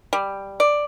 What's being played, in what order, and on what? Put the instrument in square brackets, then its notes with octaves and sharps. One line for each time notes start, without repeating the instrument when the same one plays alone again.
[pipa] G3
D5